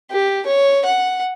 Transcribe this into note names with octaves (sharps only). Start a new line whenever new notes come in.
G4
C#5
F#5